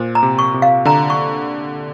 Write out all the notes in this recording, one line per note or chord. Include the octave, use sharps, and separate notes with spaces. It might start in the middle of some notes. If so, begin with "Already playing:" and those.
Already playing: A#2 C5
A#5
C3
C#6
C3
F5
D3 A#5
C#6